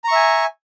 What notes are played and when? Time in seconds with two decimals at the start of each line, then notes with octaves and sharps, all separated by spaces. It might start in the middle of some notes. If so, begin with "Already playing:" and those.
0.04 A#5
0.08 C#6
0.12 E5
0.15 G#5